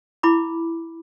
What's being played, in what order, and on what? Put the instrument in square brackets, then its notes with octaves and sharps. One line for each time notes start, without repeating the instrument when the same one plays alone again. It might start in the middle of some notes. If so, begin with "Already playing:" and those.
[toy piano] E4 B5 D6